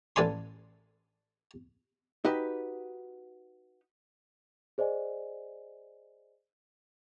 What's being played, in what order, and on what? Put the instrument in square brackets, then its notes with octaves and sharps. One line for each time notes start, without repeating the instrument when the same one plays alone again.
[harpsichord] A1 A4 D5 G#5 C6
[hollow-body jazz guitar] D#4 F#4 G4 B4
[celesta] G#4 C5 D5 D#5 G#5